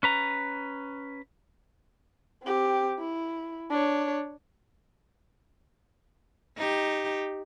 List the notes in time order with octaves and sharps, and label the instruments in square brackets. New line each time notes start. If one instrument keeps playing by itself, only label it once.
[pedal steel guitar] C#4 B4 A#5
[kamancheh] C4 G4
E4
D4 C#5
[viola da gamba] D#4 G4